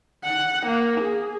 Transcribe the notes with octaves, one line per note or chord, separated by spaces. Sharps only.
F#5
A#3
G#4